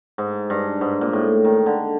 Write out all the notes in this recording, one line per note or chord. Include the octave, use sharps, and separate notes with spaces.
G#2
G2
G#2
A#2
A2
D#3
D3